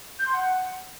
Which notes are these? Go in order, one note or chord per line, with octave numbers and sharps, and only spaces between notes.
G6
C6
F#5